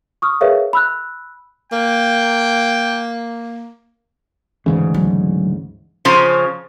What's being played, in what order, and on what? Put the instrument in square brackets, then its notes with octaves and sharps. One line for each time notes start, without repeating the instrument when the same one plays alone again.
[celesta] C#6 D#6 F6
G#4 A#4 B4 C#5 E5 F5
B5 E6 F#6
[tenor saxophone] A#3 [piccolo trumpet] G5
[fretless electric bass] D2 G#2 C#3 [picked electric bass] E3
[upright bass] F#3
[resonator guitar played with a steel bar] C#3 F3 C#4 C5